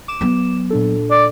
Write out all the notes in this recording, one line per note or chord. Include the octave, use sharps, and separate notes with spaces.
D6 E7
F#3 B3
A#2 D4 A4
D5